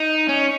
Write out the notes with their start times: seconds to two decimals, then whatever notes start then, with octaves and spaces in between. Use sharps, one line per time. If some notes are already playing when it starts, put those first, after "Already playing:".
Already playing: D#4
0.29 C#4